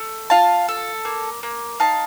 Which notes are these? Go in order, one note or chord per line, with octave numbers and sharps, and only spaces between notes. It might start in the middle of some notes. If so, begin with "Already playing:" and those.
Already playing: A3
F4 F5 A5
A4
A#3
A#3
D#4 F5 A5